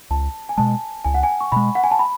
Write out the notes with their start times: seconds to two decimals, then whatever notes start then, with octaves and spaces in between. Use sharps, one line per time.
0.11 C#2 A5
0.49 G#5
0.58 B2 G#3 A5
1.05 C#2 G#5
1.14 F#5
1.23 G#5
1.41 C#6
1.52 B2 G#3 B5
1.75 F#5
1.84 G#5
1.91 A5
1.99 B5